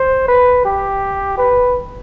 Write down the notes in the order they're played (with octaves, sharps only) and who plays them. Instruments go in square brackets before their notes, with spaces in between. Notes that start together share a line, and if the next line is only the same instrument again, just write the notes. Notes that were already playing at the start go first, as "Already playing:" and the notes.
Already playing: [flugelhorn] C5
B4
G4
B4